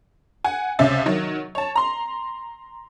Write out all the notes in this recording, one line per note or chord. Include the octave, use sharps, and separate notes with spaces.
F#5 G#5
C#2 C3 C#4 E5 A6
D#3 F#3
C#5 A5
A#5 C6